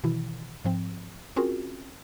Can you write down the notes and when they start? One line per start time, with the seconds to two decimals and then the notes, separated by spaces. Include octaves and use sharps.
0.04 B2 D#3 E3 E4
0.65 G#2 F3 C4
1.36 C4 C#4 F4 F#4 G#4 A#4